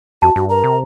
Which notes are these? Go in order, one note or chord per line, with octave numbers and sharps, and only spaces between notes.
F2 F#4 A5
G2 F#4
A#4 A#5
C3